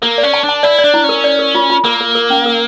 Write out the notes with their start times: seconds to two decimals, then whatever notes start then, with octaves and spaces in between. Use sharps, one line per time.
0.02 A#3 A#4
0.18 D5
0.23 C#4
0.34 A5
0.43 D4
0.49 A5
0.63 E4 D5
0.78 D5
0.84 D4
0.94 E4
1.04 C#4
1.09 A#4
1.24 D5
1.39 A#4
1.55 F4
1.70 F4
1.84 A#3 A#4
2.01 A#4
2.15 A#4
2.30 C#4
2.46 A#4